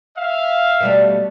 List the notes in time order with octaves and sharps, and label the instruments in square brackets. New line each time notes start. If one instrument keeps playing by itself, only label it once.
[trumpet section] E5 F5
[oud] B2 G3 A3